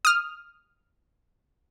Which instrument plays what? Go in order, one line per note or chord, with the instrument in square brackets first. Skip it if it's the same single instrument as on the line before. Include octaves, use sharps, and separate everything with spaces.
[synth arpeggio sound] D#6 F6